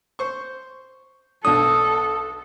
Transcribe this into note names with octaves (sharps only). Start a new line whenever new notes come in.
C5 C#6
B1 D4 A4 D#6